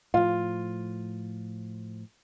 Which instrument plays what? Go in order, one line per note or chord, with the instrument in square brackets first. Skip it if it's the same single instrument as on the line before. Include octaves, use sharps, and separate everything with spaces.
[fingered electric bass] A2 F3 [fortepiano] F4